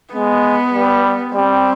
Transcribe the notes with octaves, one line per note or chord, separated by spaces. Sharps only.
G#3 B3
G3
G3 C4